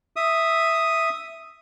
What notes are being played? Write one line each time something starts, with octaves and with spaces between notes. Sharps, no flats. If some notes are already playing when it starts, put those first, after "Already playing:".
E5 D#6